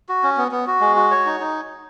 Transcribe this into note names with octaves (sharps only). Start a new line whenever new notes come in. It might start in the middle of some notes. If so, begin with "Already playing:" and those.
F#4
C#4
B3
B3
F#4
G#3
F#4
C#5
D#4
D#4